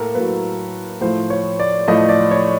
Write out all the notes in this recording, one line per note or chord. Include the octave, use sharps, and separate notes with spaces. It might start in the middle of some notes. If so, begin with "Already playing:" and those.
Already playing: A2 A#3 A4 A#4
A2 F#3 A#3 B4
A2 F3 A3 C5
C#5
D5
A2 F3 A3 D#5
D5
C#5